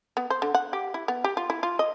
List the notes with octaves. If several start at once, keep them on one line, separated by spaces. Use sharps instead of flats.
B3
C5
D3
F#5
G4
E4
B3
G4
F4
E4
F4
D#5